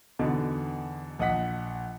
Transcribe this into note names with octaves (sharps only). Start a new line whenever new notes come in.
E2 B2 D3 D#4
A#1 D#5 F#5 B6